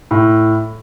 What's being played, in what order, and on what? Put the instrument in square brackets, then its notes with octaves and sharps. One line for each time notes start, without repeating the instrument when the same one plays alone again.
[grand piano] A2